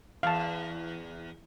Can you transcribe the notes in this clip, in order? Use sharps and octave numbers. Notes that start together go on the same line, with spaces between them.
E2 F5 A5